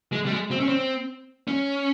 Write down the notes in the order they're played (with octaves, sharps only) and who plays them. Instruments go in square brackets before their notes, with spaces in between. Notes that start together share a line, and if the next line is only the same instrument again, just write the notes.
[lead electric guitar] G#3
G3
G#3
C4
C#4
C4
C#4